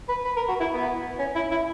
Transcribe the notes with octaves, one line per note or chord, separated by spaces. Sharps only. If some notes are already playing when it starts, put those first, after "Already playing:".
B4
B4
A#4
F#4
E4
B3
C#4
E4
E4